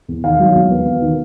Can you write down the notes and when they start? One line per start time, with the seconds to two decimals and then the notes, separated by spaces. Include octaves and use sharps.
0.08 E2
0.24 D#3 F5
0.39 F#3
0.55 E2
0.70 B3
0.87 B3
1.02 D#3